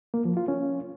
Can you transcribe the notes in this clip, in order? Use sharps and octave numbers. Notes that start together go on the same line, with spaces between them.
A#3
F3
F4
C#4